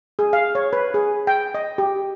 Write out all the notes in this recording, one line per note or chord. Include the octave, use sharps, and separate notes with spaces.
G#4
F5
C#5
B4
G#4
G5
D#5
G4